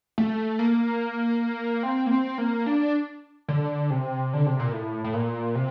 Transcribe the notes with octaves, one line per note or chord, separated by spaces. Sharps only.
A3
A#3
C4
A#3
C4
A#3
D4
D3
C3
D3
C3
A#2
A2
A2
A#2
C3